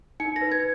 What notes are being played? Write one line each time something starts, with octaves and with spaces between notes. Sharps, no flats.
D#4 C#7
A#6
B4
G#6